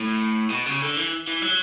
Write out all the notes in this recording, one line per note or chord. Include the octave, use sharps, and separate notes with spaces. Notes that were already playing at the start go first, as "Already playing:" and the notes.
Already playing: A2
B2
C#3
D3
E3
E3
F#3